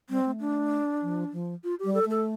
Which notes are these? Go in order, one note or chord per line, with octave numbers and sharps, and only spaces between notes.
G3 C4
A3
D4
F3
F3
F4
G4
G3
A4
A3
A4